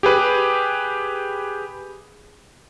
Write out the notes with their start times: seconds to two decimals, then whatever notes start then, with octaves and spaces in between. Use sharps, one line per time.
0.03 G4 G#4 B4